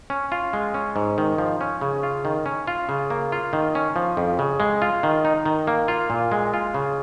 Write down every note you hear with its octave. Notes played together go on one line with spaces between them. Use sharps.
C#4
F4
G#3
C#4
G#2
D#3
F3
C#4
C#3
F4
D#3
C#4
F4
C#3
A#3
F4
D#3
C#4
F3
F2
C#3
G#3
F4
D#3
D#4
D#3
A#3
F4
A#2
G#3
F4
C#3